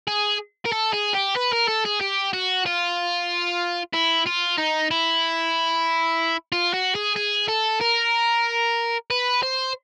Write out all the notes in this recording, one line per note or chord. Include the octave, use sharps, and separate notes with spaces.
G#4
A#4
A4
G#4
G4
B4
A#4
A4
G#4
G4
F#4
F4
E4
F4
D#4
E4
F4
F#4
G#4
G#4
A4
A#4
B4
C5